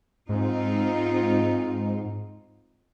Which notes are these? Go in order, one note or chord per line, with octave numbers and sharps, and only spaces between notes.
G#2 C4 D#4 F4